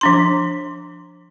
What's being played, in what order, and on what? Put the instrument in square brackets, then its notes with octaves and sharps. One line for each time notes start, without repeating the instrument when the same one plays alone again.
[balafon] F3 D4 C6